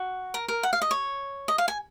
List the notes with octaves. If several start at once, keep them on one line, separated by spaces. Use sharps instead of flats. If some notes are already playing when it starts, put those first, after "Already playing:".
Already playing: F#4
A#4
A#4
F#5
F5
D#5
C#5
D#5
F5
G#5